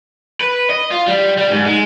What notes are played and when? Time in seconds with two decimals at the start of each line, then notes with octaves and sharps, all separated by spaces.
0.41 B4
0.70 D#5
0.91 F4
1.08 G3
1.38 G3
1.51 G#2
1.66 G#3